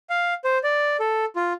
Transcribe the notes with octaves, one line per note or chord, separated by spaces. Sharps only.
F5
C5
D5
A4
F4